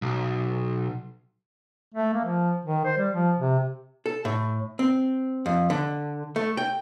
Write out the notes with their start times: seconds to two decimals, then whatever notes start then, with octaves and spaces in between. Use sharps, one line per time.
0.02 B1
1.94 A3
2.14 A#3
2.25 F3
2.65 D#3
2.85 C5
2.98 G3
3.13 F3
3.38 C3
4.06 A4
4.25 A2
4.79 C4
5.46 F2
5.70 D3
6.36 A3
6.57 G5